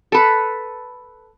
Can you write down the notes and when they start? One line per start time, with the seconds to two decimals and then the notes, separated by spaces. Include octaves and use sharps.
0.12 A4 B4